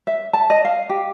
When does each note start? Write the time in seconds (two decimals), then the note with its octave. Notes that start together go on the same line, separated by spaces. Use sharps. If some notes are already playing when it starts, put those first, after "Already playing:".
0.07 E5
0.33 A5
0.50 D#5
0.65 F5
0.89 G4